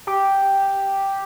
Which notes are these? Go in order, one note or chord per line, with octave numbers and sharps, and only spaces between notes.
G4